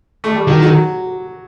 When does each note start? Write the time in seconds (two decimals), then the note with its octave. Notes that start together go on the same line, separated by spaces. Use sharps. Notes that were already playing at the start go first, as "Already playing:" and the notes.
0.24 A3
0.35 G3
0.47 D#3 F#3
0.63 F#3